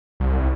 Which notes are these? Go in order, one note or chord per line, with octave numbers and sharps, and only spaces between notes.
C2